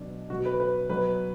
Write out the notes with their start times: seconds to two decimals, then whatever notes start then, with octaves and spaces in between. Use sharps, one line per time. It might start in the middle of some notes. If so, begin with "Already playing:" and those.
Already playing: B2 F#3 D4
0.30 B2 F#3 F#4
0.45 B4
0.60 B4
0.89 B2 F#3 B4